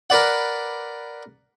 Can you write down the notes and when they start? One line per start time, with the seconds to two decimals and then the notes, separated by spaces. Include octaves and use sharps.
0.10 A#4 B4 D5 F#5